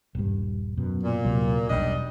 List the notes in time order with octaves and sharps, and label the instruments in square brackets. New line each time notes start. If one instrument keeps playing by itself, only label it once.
[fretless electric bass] D#1 G2
F#2 B2
[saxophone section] A#2
[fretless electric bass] D2 C3 F#3
[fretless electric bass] E1 B1 [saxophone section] G3 D4 D#5